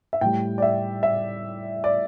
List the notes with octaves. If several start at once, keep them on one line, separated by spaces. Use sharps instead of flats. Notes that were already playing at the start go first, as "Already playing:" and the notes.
E5
A2 G3 G5
D5
E5
E5
D5